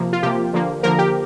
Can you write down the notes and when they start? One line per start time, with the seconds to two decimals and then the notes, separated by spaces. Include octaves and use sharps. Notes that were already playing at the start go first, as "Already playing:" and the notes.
Already playing: C3 F3 A#3
0.13 F4
0.23 C3 F3 A#3 G4
0.53 D3 F3 A#3
0.83 D3 F3 A#3 A#4
0.99 G4